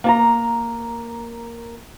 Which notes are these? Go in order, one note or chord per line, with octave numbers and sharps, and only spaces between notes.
A#3 A5 A#5